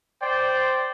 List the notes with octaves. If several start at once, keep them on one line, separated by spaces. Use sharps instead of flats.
C5 D5 G5